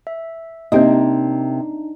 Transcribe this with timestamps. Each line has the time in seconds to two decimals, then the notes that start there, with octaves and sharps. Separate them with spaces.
0.07 E5
0.72 C3 A#3 C4 D4 D#4 G4 D#5